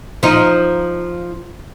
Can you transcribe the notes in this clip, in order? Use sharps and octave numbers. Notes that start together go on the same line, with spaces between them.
F3 D#4